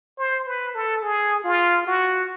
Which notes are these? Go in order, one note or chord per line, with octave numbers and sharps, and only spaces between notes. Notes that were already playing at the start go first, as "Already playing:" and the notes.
C5
B4
A4
G#4
F4
F#4